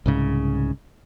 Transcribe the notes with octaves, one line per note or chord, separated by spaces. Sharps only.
C2 G#2 C#3